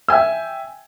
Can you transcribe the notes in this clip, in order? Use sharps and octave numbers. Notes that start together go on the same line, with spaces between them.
E5 G5 G#5 E6